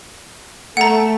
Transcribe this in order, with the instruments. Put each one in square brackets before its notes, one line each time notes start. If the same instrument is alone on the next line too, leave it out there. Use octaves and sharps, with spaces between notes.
[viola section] A3 [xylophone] F#5 A#5